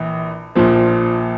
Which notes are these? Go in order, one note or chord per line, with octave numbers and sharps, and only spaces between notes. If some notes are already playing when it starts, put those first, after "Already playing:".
Already playing: A#1 E3
A#1 A#2 F3